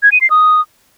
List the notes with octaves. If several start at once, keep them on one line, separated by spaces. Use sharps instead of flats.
G#6
D#7
C7
D#6